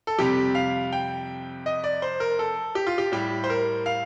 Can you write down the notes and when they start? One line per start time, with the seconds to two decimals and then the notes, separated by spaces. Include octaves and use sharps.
0.07 A4
0.18 F2 C3 G3 G4
0.55 F5
0.93 G5
1.66 D#5
1.84 D5
2.02 C5
2.20 A#4
2.39 A4
2.75 G4
2.87 F4
2.98 G4
3.12 A2 G3 G4
3.44 C5
3.50 A#4
3.86 F5